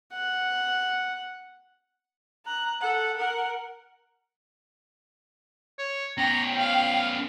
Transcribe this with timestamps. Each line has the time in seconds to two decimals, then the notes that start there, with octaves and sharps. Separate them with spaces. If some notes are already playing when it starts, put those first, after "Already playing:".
0.14 F#5
2.45 A#5 F#6
2.81 A4 F#5
3.17 A#4 F#5
5.79 C#5
6.18 B3 C#4 G5 A#5
6.59 F5